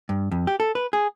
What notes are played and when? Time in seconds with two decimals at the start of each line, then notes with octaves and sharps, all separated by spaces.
0.09 G2
0.31 F2
0.47 G4
0.60 A4
0.75 B4
0.93 G#4